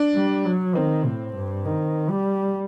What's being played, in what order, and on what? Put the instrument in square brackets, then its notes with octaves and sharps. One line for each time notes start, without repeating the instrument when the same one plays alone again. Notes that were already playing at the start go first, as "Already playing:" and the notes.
Already playing: [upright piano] D4
[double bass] G3
F#3
[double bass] D#3 [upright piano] C4
[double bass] A2
G2
D#3
G3